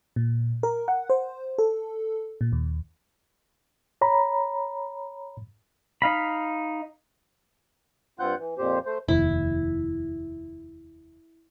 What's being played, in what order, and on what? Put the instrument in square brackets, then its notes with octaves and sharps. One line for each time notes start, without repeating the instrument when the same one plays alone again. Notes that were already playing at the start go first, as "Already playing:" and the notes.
[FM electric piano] A#2
A#4
F#5
C5
A4
A#2
D#2
[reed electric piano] C#5 A#5 B5
[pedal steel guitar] D#4 F5 B5
[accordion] G2 C4 F4 F#5 F#6 G6
E3
F2 A#2 G4 C5
A3 C5
[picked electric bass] F1 D#2 [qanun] E4